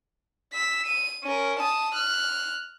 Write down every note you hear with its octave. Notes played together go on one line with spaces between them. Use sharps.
E6 B6
D#7
C#4 A#4
A5 D#6
F6 F#6